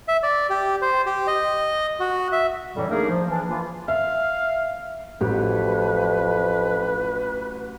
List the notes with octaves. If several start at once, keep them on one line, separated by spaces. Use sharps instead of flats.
E5
D5
G4
C5
G4
D#5
F#4
E5
F2 A2 D3 E3 F#3 G3
A3 A#3 D4 D#4 G#4 A#4
F3
E3 D4
E3 A#3 F4
E5 F5
A1 F2 F#3 G4 B4